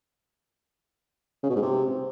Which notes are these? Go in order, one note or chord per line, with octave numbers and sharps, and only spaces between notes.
C#3
B2
G#2
C3